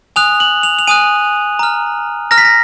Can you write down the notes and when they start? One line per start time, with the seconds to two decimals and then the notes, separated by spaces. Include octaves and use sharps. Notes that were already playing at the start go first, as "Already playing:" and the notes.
0.16 G#5 D#6 F#6 F7
0.40 F#7
0.63 F7
0.79 F7
0.87 G#5 D#6 F#6 D#7
1.59 A#5 F6
2.31 A#5 F6 A#6
2.38 B6
2.45 A#6